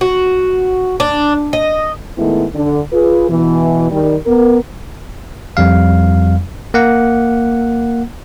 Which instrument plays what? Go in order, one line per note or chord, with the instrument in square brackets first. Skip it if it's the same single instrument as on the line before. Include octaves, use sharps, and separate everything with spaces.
[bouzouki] F#4
D4
D#5
[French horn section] D#3 G#3 A3 B3 E4
D3
F4 G#4 B4
B2 E3
D#3 G3
B3 A#4
[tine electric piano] F2 G3 F5
A#3 F#5